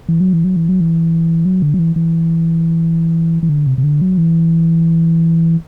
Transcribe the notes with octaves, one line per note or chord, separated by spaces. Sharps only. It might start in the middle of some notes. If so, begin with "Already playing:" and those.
E3
F#3
E3
F#3
E3
F#3
E3
F#3
D3
F#3
E3
E3
E3
D3
C3
C3
D3
F#3
E3